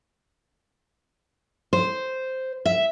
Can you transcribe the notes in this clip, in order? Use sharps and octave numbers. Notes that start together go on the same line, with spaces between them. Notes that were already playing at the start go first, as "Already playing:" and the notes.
C5
E5